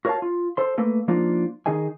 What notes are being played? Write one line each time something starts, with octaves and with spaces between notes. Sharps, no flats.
F#4 A#4 C#5 E5 F5 A5
F4
A4 C5 C6
A3 A#3 A4 B4
F3 A#3 D4 D#4 F4
D#3 D#4 G#4 D#5 G#5